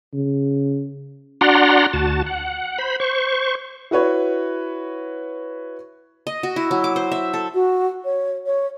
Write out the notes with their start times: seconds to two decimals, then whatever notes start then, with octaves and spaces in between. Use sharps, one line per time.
0.13 C#3
1.41 D4 F#4 D5 F#5 A#5 C6
1.93 D2 F#4 A5
2.26 F#5
2.78 C5 B5
3.00 C5 C#6
3.91 E4 F#4 B4 C#5
6.27 D#5
6.43 F#4
6.56 E4
6.71 F#3
6.84 D6
6.96 C5
7.12 E5
7.34 A4
7.54 F#4
8.05 C#5
8.46 C#5